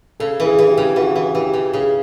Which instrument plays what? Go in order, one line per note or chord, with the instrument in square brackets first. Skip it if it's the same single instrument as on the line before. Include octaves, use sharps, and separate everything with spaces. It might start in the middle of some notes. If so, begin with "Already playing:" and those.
[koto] C#3 [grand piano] A4
[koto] E3
[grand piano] G#4
[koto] E3
[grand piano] G4
[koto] C#3
[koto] E3 [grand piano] F#4
[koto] E3
[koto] E3 [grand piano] G4
[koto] C#3
[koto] C#3 [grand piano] G#4